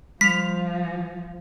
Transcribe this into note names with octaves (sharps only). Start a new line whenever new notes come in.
F3 G3 B6 F7